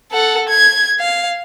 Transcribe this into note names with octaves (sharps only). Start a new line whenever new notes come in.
A4 F#5
G#6
F5